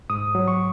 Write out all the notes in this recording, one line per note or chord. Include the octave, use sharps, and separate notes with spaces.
G#2 D#6
F#3
C#6